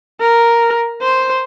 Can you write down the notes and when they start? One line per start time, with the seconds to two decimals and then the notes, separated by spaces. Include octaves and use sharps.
0.21 A#4
1.03 C5